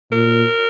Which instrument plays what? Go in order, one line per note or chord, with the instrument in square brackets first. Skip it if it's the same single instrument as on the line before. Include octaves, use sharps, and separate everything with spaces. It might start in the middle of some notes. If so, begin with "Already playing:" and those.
[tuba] A#2 [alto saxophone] A#4